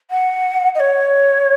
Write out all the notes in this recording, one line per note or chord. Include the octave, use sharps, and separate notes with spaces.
F#5
D#5
C#5